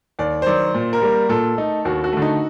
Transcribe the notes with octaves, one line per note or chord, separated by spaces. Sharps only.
D#2 D5
C5
D#3 F#3 D5
A#2
A#4
G3 A#3
A#2 A4
A3 D#4
D#2 F#4
F#4
D3 A3
D#4